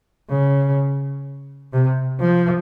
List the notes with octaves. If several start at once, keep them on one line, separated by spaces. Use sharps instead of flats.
C#3
C3
F3